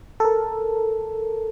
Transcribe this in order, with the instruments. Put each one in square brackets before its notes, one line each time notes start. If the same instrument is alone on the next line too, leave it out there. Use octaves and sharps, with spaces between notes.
[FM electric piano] A4 A#4